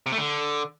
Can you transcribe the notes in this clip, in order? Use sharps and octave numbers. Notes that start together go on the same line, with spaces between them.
C3
A3
D3